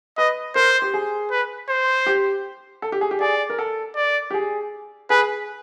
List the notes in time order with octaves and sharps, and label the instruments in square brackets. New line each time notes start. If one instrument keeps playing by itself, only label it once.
[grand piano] B4 [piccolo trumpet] D#5
[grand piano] A#4 [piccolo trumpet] C5
[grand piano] G4
G#4
[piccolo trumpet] B4
C5
[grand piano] G4
A4
G4
G#4
G4
[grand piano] G#4 [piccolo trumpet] D5
[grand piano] A#4
A4
[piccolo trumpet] D5
[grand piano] G4
G#4
[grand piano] G#4 [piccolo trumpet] B4